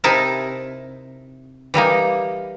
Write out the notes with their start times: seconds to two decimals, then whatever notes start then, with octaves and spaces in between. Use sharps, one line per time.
0.04 C3 D#4 E4 A#4 A5
1.74 E3 G3 A#3 D#4